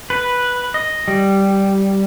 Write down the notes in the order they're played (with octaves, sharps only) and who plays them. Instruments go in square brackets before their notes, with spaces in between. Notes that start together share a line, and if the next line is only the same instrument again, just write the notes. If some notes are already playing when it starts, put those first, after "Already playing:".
[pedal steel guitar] B4
D#5
G3